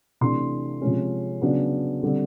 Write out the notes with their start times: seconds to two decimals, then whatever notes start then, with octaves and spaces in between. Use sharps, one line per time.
0.21 C3 E3 A3 D4 C6
0.82 C3 F3 G#3 C#4
1.42 C#3 F#3 B3 D4
2.03 D3 G3 C4